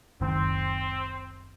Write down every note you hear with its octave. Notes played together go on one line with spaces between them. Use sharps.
F#1 C#2 D#3 C4